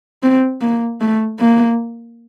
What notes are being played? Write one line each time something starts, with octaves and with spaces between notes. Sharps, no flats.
C4
A#3
A3
A#3